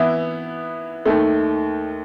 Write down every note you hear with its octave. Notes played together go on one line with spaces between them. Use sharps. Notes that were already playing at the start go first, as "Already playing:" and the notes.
Already playing: E3 B3 E4
D#2 D#3 A3